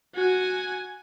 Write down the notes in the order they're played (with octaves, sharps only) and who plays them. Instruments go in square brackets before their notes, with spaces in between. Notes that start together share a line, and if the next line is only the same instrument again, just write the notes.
[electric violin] F#4 G#5